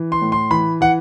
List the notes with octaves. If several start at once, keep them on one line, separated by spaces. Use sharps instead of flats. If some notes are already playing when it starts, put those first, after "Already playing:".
Already playing: E3
C6
A2
C6
E3 B5
E3 F#5